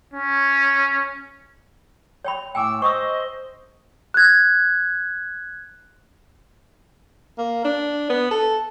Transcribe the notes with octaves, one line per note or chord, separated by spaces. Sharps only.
C#4
C#5 G5 B5
A2 A3 G5 G#5 D6 E6
C5 D#5 C#6 D#6 E6
F#6 G#6
A#3
D4
B3
A4